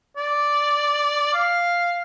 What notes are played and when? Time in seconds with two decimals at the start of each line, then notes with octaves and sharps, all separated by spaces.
0.17 D5
1.34 F5